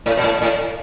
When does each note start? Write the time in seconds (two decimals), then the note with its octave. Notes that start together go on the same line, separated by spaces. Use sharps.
0.06 A2
0.17 B2
0.24 A2
0.42 A2